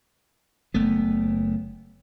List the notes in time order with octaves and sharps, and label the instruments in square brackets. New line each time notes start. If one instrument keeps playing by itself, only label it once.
[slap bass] F#1 A3 B3